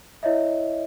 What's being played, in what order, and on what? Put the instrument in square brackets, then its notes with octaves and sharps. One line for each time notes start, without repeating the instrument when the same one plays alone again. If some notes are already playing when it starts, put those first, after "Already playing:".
[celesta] E4 C#5 D#5 E5